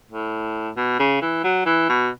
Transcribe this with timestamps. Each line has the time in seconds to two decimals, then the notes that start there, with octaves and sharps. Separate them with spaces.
0.10 A2
0.76 B2
0.99 C#3
1.22 E3
1.44 F#3
1.66 E3
1.89 B2